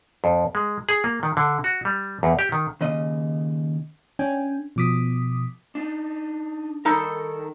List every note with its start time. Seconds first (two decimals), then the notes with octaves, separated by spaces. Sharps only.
0.24 F2
0.55 G#3
0.89 G#4
1.04 A#3
1.23 D#3
1.37 D3
1.64 F#4
1.85 G3
2.23 E2
2.39 G4
2.52 D#3
2.81 D#2 C#3 D#5
4.19 C#4 D4 G5 G#5
4.76 B2 F3 D6 D#6 B6
5.75 D4 D#4
6.85 D#3 G3 D#4 A4 A#4